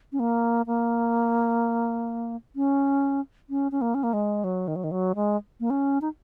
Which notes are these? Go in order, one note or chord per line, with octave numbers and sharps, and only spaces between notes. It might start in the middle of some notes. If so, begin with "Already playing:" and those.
C#4
A#3
A#3
C#4
C#4
C#4
A#3
C#4
A#3
G#3
F#3
D#3
F#3
D#3
F#3
G#3
A#3
C#4
D#4